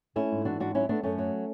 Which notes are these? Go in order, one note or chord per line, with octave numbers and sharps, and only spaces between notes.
A3 C#4 E4
G#2
E3 D4 F#4
G#2 D4 F#4
F#3 C#4 E4
A3 B3 D4
F#2 A3 C#4
F#3